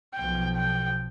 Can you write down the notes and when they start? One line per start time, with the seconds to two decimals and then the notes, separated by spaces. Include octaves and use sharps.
0.15 B1 F3 G5
0.56 G5